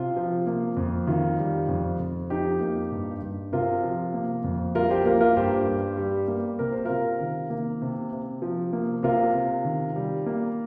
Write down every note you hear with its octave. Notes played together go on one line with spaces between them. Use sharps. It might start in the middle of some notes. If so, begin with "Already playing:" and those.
Already playing: C3 F4
F3
A#3
F2
D#3 F4
G3
F2
F2
F3 D#4 G4
A#3
G2
G2
C3 F4 A#4
F3
A#3
F2
G3 F4 A#4
G4 C5
A#3 F4 A#4
F4 A#4
G2 G4 C5
G2
G3
A#3
C3 A#4
C5
C3 F4 A#4
D#3
A#3
C3
C3
F3
A#3
C3 F4 A#4
C3
D#3
G3
A#3